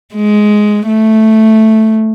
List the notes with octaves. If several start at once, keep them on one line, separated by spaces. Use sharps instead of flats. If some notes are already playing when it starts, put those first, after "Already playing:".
G#3
A3